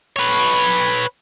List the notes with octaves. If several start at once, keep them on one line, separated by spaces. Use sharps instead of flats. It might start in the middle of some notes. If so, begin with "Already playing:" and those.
B4 C#5